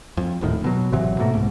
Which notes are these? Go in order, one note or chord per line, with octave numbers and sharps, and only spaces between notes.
F2
D#1 A2 D#3
B2 F#3
G#1 C3 E3 F#3
G#2 B2 A3 A#3
C2 G#2